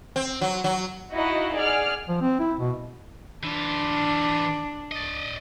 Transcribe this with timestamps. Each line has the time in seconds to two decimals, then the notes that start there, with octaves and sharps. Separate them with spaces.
0.16 C4
0.41 F#3
0.64 F#3
1.13 D#4 E4 F#4 D#5 F5
1.55 G#4 D5 F#5 F6
2.08 F3
2.22 C4
2.40 E4
2.59 B2
3.43 E3 D4 F4
4.91 D5 D#5